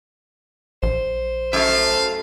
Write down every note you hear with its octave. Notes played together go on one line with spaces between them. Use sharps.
A#1 C5
F#2 A3 F5